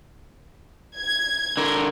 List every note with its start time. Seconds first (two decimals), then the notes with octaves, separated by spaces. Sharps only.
0.98 G#6
1.57 D3 A#4